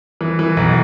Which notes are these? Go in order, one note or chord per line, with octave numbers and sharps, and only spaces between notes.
E3
E3
B1